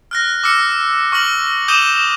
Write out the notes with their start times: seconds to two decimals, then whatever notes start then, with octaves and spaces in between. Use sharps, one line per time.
0.11 F6 F#6 A#6
0.43 D6 E6 F6 C#7
1.12 C#6 F6 A#6 F#7
1.68 D6 D#6 G6 D#7 E7 G7